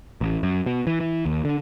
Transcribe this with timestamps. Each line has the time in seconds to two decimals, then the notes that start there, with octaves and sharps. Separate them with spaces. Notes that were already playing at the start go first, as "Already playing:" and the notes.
0.21 A1
0.43 F#2
0.66 B2
0.87 E3
1.00 E3
1.26 D#2
1.45 D3